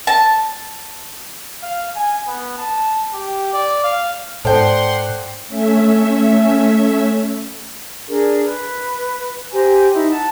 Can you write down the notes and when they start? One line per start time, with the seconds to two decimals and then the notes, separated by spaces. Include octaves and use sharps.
0.07 A5
1.63 F5
1.96 G#5
2.27 B3
2.58 A5
3.14 G4
3.53 D5
3.84 F5
4.45 G#2 A4 C5 D5 F#5 G5 A5 C6
5.48 A3 C#4 E5
8.08 D4 G#4 A#4
8.45 B4
9.52 G4 C5 G#5 A#5
9.93 D#4 E4
10.10 F#5 A5